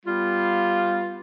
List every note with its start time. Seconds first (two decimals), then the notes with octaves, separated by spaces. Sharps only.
0.06 G3 B3 F4